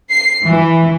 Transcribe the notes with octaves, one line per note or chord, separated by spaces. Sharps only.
C7
E3